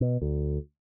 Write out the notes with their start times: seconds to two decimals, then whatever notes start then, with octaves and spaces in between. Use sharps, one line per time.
0.01 B2
0.21 D2